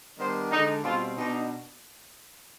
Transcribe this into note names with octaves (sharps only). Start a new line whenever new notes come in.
D#3 G3 B3 D4 C5
D3 G#3 D4 D#4
B2 G3 C4 F4
B2 B3 D4 D#4